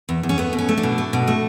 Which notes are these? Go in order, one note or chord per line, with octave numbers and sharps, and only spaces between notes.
E2
E2
C#4
A3 B3
B2
C#4
A3
D4
B2
A3
B2
A3